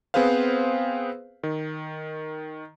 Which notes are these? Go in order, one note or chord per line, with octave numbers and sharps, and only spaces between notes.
B3 C4 G#4 B4 C5 F5
D#3